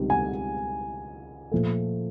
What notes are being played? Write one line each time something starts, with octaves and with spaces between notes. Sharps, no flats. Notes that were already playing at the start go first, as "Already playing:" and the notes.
Already playing: C#2 C3 D#3 G3
G#5
A#2 F3 A3